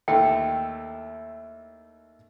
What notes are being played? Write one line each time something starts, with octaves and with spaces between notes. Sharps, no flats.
D#2 A3 E4 G5